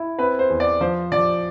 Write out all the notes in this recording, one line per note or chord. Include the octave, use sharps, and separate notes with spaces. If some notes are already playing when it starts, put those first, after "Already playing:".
Already playing: E4
C4 B4
C5
E2
D5
F3 C5
F3 D5